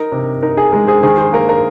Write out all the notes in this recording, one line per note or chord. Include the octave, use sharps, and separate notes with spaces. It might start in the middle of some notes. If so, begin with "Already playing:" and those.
Already playing: D#4 A#4
C3
D#4 A#4
G#4
G#3 A#4
G#4 C5
D#3 G#4 C5
G#4 C5
A#3 A#4
A#4